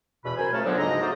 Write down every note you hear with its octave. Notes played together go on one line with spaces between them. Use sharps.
E2 B2 B5
F#2 A#4 C5 G#5
C#3 F3 A3 C#5 A5 F6
D3 F3 F#3 B3 C4 D4
D2 G#2 C#3 D#5 A#5
F#3 A3 D#4 G#4 C5 D5